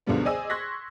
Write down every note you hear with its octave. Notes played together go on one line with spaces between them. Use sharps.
C#2 B2 D3 F3 G3 B3
G#4 C5 D5 D#5 G#5 E6
C6 C#6 F#6 G#6 A#6 B6